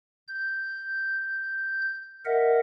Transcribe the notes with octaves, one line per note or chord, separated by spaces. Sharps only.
G6
A#4 D#5 E5 F#5